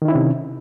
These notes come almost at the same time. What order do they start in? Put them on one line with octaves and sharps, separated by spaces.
D#3 D#4 E4 C#4 C3